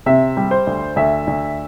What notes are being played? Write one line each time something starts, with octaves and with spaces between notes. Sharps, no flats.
C3 E5
G3
C5
D2
D2 E5
D2